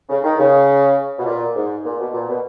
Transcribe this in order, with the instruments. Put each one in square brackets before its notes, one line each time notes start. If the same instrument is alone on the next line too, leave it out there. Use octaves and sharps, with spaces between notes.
[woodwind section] C#3
D#3
C#3
B2
A#2
G#2
A#2
B2
A#2
B2